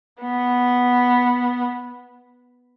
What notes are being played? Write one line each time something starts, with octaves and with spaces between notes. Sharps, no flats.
B3